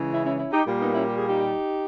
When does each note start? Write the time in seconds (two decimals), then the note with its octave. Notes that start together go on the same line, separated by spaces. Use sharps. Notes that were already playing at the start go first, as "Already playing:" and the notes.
Already playing: C#3 E3 G#3
0.11 C#4 E4
0.25 C#4 E4
0.39 C#4 E4
0.53 D#4 G4
0.67 A#2 G3 A#3
0.80 B3 D#4
0.94 C#4 E4
1.08 G4
1.18 G#4
1.28 D#4 G4